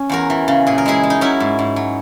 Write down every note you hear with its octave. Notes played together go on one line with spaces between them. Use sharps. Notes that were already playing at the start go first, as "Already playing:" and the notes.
Already playing: C#4
E2 F#4 A#4
E3
C#3
A#2 G#4
A#4
G#3 E4 G#4
G#3
D#4
F#3 C#4 E4
G#2
G#2
F#3